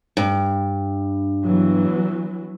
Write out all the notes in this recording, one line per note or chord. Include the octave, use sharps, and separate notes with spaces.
G2
E3 F#3 B3